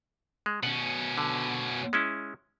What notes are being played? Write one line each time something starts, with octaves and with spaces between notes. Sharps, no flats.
G#3
B2 C#4 F#5
D3
G#3 C#4 E4